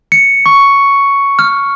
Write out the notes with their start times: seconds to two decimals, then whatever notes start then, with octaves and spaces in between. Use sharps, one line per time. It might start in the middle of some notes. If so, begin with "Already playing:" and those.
0.12 C#7
0.46 C#6
1.39 F6